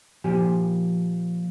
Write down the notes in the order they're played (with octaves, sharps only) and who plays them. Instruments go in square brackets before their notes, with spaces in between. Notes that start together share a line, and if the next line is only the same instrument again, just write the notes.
[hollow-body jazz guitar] A#2 F3 G4 C5 G#5